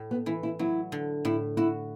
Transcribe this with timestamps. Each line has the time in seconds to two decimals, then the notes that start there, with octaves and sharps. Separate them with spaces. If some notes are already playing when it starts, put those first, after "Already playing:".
Already playing: A2
0.11 B3
0.26 E3 E4
0.43 E4
0.59 F#3 E4
0.92 D3
1.25 A2 E4
1.57 E4 F#4